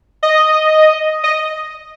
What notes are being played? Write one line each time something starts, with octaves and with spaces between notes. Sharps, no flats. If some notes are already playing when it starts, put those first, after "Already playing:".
D#5
D#5